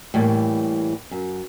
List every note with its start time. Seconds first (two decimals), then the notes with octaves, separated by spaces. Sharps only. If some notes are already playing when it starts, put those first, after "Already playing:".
0.14 A2 E3 G3 A#3
1.11 F#2